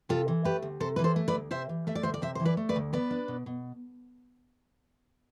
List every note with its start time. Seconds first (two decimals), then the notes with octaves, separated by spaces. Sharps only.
0.09 C3 F4 A4
0.28 E3
0.44 A3 G4 B4
0.62 D2
0.80 C3 A4 C5
0.96 E3 B4
1.04 A4 C5
1.16 A3
1.28 B4 D5
1.34 D2
1.51 C3 C5 E5
1.69 E3
1.87 A3 E5
1.95 D5
2.03 D2 C5 E5
2.14 D5
2.22 C3 C5 E5
2.35 E3 C5
2.45 B4 D5
2.57 A3
2.69 B4 D5
2.76 D2
2.93 B3 B4 D5
3.11 D4
3.28 B2
3.46 B2